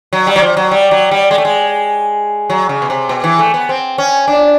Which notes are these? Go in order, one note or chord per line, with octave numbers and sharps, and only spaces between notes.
F#3
G3
F#3
F3
F#3
G3
F#3
G3
G#3
A3
G#3
F#3
C#3
B2
C3
B2
E3
A3
B3
C4
C#4
D4